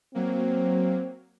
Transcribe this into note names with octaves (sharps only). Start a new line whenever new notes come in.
F#3 A#3 C4